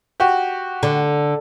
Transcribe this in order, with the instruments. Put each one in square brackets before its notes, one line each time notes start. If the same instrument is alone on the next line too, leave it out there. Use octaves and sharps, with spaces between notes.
[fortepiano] F#4 G4
[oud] D3